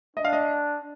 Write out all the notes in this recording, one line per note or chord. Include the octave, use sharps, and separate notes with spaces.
D4 D#5
F5
D#5